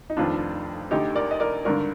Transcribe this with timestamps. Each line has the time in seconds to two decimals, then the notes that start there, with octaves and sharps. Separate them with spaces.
0.10 D#4
0.17 F1 F2 D#3 D4 F4
0.91 D2 D3 D#4 G4
1.15 A#4 D5
1.31 D#5
1.40 A#4 D5
1.65 G#1 G2 D3 A#4 D5